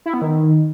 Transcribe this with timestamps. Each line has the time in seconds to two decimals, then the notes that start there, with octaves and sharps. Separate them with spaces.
0.06 E4
0.14 B3
0.22 D#3